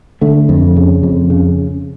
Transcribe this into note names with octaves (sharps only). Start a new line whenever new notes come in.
D3 A3
F2
C#3
F2
C#3